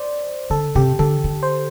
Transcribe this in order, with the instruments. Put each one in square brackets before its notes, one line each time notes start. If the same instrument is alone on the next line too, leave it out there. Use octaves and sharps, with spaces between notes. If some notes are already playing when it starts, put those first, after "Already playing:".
Already playing: [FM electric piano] C5 D5
[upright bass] D3 [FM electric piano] A4
[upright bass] C3 [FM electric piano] G4
[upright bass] D3 [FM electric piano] A4
[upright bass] D3
[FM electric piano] C5